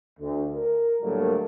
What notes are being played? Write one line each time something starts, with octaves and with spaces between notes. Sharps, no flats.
D2
A#4
A2 D3 F#3 G3 A3 A#3